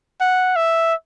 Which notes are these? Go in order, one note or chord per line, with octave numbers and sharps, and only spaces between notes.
F#5
E5